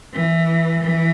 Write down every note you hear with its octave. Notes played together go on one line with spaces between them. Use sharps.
E3
E3